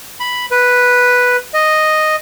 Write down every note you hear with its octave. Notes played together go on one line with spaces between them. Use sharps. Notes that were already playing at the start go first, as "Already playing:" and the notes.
B5
B4
D#5